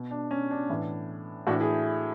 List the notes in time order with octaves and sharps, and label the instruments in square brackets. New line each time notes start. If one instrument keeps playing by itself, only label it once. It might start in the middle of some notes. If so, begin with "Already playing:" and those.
Already playing: [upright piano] B2
D4
C#4
D4
A2 E3
A2 E3 D4 F#4
E4 G#4